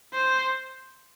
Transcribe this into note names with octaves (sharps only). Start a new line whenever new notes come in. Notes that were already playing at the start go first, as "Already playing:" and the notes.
C5